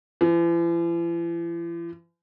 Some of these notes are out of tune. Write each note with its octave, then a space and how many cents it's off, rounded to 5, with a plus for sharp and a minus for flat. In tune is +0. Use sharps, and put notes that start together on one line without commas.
E3 +45